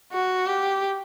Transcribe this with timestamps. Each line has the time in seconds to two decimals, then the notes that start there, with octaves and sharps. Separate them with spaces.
0.12 F#4
0.47 G4